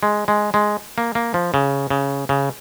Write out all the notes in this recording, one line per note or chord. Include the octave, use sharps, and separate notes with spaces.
G#3
G#3
G#3
A#3
A#3
F3
C#3
C#3
C#3